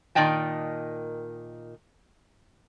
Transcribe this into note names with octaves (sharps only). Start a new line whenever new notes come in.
A#2 D#3 D5 D#5 G5 A5